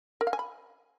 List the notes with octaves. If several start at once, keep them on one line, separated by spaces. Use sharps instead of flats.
A#4
F5
G#5
B5